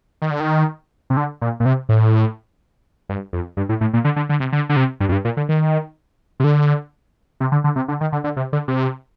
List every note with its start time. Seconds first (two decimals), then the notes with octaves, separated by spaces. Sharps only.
0.22 D#3
0.31 D3
0.40 D#3
1.10 C3
1.17 D3
1.41 A#2
1.60 A#2
1.65 C3
1.89 A2
3.09 G2
3.33 F2
3.57 G2
3.69 A2
3.81 A2
3.94 A#2
4.05 D3
4.16 D3
4.29 D3
4.40 C3
4.53 D3
4.69 D3
4.76 C3
5.00 G2
5.09 F2
5.12 G2
5.25 A#2
5.37 D3
5.49 D#3
6.40 C3
6.44 D3
7.40 C3
7.52 D3
7.64 D3
7.76 C3
7.88 D3
8.01 D#3
8.12 D3
8.24 D3
8.37 C3
8.53 D3
8.68 C3